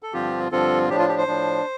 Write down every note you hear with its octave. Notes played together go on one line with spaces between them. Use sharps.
A4
G2 D3 F3 C4 F4 G4
G2 D3 F3 C4 F4 A4
A2 F3 D4 G4
F4
G4
C5
A2 F3 D4